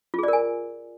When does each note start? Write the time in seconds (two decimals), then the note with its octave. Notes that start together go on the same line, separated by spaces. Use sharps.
0.14 F4
0.19 G#4
0.23 D5
0.28 A#4
0.33 G#5